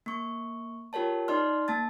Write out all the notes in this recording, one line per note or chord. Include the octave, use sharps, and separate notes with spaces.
A#3 C#6
F4 G4 A#4 C#5 A5
D#4 D5 C6 F6
A#3 A5 A6